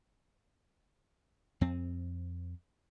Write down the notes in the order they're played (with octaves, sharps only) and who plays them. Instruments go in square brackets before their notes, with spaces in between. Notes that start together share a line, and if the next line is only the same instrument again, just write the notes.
[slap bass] F2 C4